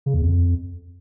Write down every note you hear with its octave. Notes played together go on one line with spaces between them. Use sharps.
C#3
E2
F2